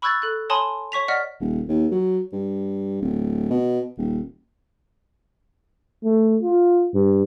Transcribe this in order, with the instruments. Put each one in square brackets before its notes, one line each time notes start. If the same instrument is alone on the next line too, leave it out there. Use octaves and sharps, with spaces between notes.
[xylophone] B5 C#6 E6 F#6 G#6 A6
A4 F#6
C#5 G#5 A5 B5 C6 D#6
C#5 C#6 B6 F7
D5 D#5 F#5 F6 B6
[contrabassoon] D#1
D#2
F#3
G2
D1
B2
D#1
[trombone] A3
F4
G2